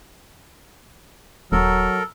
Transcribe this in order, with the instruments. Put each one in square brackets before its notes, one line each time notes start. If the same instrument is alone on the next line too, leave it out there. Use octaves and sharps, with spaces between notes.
[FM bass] D#1 [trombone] F#3 [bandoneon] A4 A#4